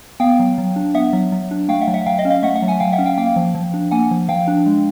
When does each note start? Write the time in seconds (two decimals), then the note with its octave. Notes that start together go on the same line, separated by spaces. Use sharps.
0.20 B3 F5 G5
0.39 F#3
0.58 F#3
0.76 D4
0.95 B3 E5 F#5
1.13 F#3
1.32 F#3
1.51 D4
1.69 A3 F5 G5
1.81 E5 F#5
1.87 F#3
1.94 E5 F#5
2.06 F#3 F5 G5
2.18 D#5 F5
2.25 C#4
2.30 D#5 F5
2.43 A3 E5 F#5
2.55 E5 F#5
2.62 F#3
2.68 F#5 G#5
2.80 F#3 F5 G5
2.92 E5 F#5
2.99 C#4
3.06 F5 G5
3.18 A#3 F5 G5
3.36 F3
3.55 F3
3.74 D4
3.91 A#3 F#5 G#5
4.11 F3
4.29 F3 F5 G5
4.48 D4
4.66 G#3